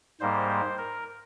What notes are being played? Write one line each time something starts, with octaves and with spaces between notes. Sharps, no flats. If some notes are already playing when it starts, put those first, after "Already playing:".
G#2 G3 A#3 C5
C5
A#4